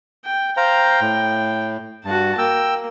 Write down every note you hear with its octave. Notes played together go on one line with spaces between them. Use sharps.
G5
C5 F5 G5 A#5
A2
G2 F#4 A5
A#3 G5 E6